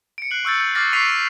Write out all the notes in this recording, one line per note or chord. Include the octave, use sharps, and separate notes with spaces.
C#7 D7
F#6 C7 F#7
C#6 E6 G6 A6
G6
D6 F6 G6 A6 A#6 C7
C#6 B6 C7 D#7 F7